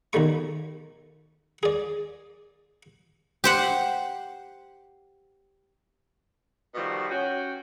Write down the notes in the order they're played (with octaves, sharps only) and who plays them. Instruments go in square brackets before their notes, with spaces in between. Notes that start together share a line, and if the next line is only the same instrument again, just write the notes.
[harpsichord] B1 D#3 G3 A3 C#6
G#4 D5
[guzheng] G4 C5 F#5
[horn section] B2 D#3 F3 G3 A3 F#4
C#4 F#4 G5